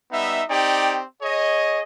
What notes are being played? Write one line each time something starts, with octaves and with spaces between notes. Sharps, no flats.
G3 B3 D#4 E5
C4 D#4 G4 D5 G5
G#4 C#5 D#5